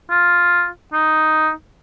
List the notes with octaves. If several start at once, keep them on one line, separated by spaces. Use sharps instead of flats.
F4
D#4